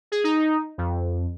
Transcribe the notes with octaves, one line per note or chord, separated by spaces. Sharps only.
G#4
D#4
F2